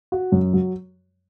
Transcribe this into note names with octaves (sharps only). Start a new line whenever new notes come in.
F#4
F#2
F#3